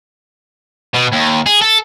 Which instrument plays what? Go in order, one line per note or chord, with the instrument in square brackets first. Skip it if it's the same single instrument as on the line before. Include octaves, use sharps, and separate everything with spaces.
[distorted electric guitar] B2
D#2
G#4
A4